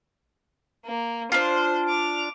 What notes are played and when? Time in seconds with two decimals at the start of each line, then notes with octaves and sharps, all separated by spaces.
0.85 A#3
1.32 D4 F4 C5
1.88 D6 F7